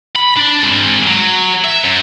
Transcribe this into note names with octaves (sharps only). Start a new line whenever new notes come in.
B5
D4 D5
G#3 C4
F#3
E5
F#2